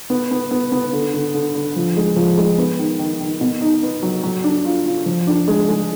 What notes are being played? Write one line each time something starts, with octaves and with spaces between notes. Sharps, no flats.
B3
B3
B3
B3
D3
D3
D3
D3
F3
G#3
F3
G#3
B3
D#3
D#3
D#3
B2
D#4
B3
F#3
F#3
D4
F4
F4
F3
D4
G#3
G#3